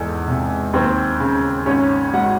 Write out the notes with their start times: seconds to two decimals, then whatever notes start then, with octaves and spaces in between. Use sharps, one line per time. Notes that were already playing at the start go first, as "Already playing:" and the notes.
Already playing: E2 G#2 A4
0.28 C3
0.73 D#2 C4 C5
1.20 C#3
1.66 G#1 C#4 C#5
2.13 G#2 F#4 F#5